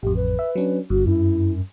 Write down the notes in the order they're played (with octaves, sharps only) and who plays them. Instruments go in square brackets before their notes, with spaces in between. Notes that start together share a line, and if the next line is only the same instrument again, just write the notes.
[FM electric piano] A1 F2 [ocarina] G4
[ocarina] B4
[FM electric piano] E5
F#3 C#4 D4
[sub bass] G1 [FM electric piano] G2 [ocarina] F#4
[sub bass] F#2 [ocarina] E4